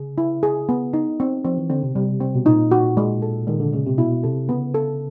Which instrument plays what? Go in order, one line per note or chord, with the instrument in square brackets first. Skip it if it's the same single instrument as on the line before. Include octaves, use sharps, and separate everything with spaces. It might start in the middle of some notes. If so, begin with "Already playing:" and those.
Already playing: [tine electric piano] C#3 [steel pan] G#4
[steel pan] E4
G#4
B3
D#4
C4
[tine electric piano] F3 [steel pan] C4
[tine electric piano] E3
[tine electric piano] D3 [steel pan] C4
[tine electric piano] C3
[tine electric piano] C3 [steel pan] G3
[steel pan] C4
[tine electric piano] B2
[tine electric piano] A#2 [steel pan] D#4
[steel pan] F#4
G#3
A4
[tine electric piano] D#3 [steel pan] G#3
[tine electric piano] D3
[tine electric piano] C#3 [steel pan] G#3
[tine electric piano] C3
[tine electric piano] B2 [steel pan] E4
[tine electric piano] C3 [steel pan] A4
[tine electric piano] C#3 [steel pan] B3
[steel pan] A4